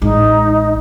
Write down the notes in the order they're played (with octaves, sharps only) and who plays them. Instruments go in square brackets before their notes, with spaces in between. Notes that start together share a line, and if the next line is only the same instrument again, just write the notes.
[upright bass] A1 G#3 [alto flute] D#4